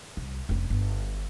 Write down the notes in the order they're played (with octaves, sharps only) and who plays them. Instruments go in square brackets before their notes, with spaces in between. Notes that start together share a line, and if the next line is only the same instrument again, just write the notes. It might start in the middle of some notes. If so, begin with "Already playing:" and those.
[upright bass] C2
F1 C#4
G1